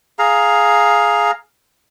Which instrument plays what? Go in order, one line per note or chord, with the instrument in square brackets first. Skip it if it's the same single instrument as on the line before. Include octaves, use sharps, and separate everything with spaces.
[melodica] G#4 F5 A#5